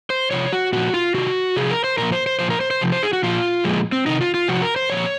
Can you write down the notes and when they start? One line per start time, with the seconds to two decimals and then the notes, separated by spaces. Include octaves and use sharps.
0.10 C5
0.31 C3 F3 C#5
0.53 F#4
0.72 A#2 F3 F#4
0.94 F4
1.14 C3 D#3 F#4
1.56 C3 F3 G#4
1.71 A#4
1.84 C5
1.98 A#2 F3 A#4
2.12 C5
2.26 C5
2.39 A#2 F3 C5
2.50 A#4
2.61 C5
2.71 C5
2.81 C3 F3
2.92 C5
3.03 G#4
3.13 F#4
3.23 A#2 F3 F4
3.64 A#2 F3 G#3
3.92 C4
4.06 C3 D#3 D#4
4.21 F4
4.34 F4
4.48 C3 F3 F#4
4.62 A#4
4.76 C5
4.90 A#2 F3 C#5